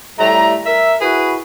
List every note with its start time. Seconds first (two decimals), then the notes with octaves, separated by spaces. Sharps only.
0.19 A2 G3 A3 A#5
0.66 A#4 E5
1.01 E4 F#4 G#4 B4